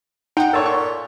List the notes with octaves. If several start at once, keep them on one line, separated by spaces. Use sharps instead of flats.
D#4 F#5 G5
A#2 A4 C#5
C#6